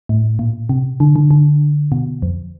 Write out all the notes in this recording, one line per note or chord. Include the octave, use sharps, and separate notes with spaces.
A2
A#2
C3
D3
D3
D3
B2
F2